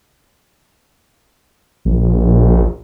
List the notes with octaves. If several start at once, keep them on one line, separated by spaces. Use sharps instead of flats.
A#1